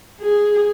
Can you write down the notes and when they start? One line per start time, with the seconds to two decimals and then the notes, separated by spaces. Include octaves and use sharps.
0.21 G#4